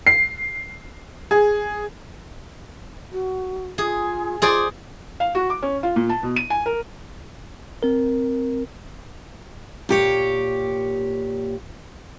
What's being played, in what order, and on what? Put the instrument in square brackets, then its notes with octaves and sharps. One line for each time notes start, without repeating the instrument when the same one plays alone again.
[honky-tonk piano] C7
G#4
[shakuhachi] F#4
[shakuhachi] F4 [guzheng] G#4
[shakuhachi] F4 [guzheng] G#4 C5 D5
[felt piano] F5
F#4
D6
C#4
F4
A#2
A5
B2
D#7
G#5
A#4
[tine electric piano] C4 A#4
[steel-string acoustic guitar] A#2 G4 C#5